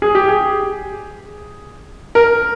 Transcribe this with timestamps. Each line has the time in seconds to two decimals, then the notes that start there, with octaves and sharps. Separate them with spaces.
0.02 G#4
0.15 G4
0.28 G#4
2.15 A#4